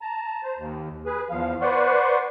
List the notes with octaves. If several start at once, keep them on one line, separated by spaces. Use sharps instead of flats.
A5 A#5
C5
D#2
G#4 B4
E2 F3 F5
B4 C5 D5 F#5 C6 C#6